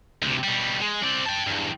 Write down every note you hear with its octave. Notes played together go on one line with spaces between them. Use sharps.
D2 C3
B2 G3
G#3
C4 D5
G5 A5
E2 G2